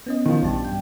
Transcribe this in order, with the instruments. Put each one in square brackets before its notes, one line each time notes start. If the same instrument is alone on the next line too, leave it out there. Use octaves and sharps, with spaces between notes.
[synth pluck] B3 C#4 D#5
[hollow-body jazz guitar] D#3 F3
[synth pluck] A#1 E3 A5 [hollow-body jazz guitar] G2
[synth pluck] G5